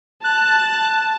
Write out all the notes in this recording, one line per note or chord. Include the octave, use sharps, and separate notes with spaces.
A5 F#6